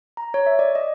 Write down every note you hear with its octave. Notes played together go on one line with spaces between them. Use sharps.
A#5
C#5
E5
D5
D#5